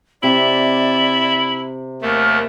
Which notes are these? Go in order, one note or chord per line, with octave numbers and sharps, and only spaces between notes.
C3 E4 D5 E5
D#2 A3 A#4